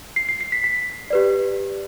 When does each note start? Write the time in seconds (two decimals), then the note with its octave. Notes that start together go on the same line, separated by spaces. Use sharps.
0.16 C7
0.29 C7
0.41 C7
0.52 B6
0.64 B6
1.10 G4 B4 D5